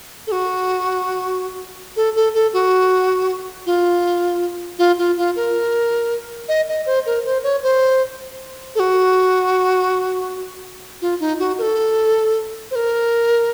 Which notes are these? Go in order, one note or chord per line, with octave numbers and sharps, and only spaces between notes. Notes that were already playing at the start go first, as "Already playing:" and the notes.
A4
F#4
A4
A4
A4
F#4
F4
F4
F4
F4
A#4
D#5
D#5
C5
A#4
C5
C#5
C5
A4
F#4
F4
D#4
F#4
A#4
A4
C5
A#4